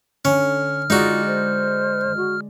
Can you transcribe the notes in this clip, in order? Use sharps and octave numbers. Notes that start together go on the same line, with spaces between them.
D3 C#4 F6
G#3 D#4 F4 F#4 D5 D#5
C5
F#4